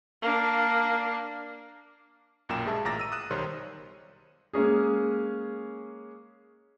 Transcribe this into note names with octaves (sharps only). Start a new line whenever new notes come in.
A#3 D4
B1 F#2 A#2 A#4 G5 E7
G2 G#3 G#4 E5 A5
A1 A#2 A#5 D6 A6 A#6
E6 D#7
D#6 F#6 D#7 E7
B1 D#3 G3 C5 C#5 C6
G#3 A#3 C#4 G#4